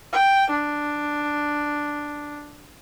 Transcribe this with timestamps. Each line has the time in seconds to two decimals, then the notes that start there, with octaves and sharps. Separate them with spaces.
0.13 G5
0.50 D4